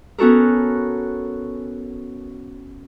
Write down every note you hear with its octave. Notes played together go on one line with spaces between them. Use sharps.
B3 C#4 F#4 A4 A#4